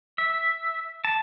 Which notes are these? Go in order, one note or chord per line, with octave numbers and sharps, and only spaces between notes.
E5
A5